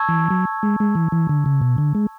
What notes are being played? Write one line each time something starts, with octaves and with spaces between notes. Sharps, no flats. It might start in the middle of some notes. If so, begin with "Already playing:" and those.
Already playing: A5 C#6 E6 G#6
E3
F#3
G#3
G#3
E3
E3
D3
C#3
B2
D3
G#3